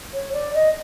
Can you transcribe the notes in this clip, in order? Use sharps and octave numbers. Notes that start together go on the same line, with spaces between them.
C#5
D5
D#5